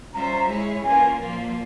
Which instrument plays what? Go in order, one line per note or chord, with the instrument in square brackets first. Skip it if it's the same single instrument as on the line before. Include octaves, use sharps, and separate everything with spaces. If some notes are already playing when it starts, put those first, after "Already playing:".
[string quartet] G3 C#4 F4 C5 E5 [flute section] A#5
[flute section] A#5
[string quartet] G#3 E4 G#4 C#5
[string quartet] E3 A#3 C#4 F4 A#4 [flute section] G#5
[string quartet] A#2 F3 A#3 F4